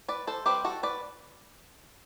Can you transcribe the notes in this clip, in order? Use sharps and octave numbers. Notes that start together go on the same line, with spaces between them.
B4 D5
A4 C5
G3 C4 G4 B4
F#4 A4
B4 D5